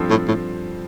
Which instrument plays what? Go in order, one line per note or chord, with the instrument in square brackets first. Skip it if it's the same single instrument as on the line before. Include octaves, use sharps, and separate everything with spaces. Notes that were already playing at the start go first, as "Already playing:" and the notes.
Already playing: [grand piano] G2 F3 C4 A4 C5
[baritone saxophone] A2
A2